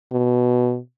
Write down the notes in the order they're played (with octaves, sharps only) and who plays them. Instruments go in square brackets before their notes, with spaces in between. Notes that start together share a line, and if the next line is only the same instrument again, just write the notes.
[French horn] B2